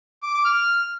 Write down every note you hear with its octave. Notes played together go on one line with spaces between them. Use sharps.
D6
D6
F6